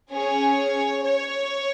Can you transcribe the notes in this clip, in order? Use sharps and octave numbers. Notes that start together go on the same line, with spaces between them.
C#4 G#4 C#5
C#5